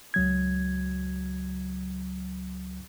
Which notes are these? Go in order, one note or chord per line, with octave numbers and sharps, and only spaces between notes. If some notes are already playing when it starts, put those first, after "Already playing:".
C#2 F#3 G#6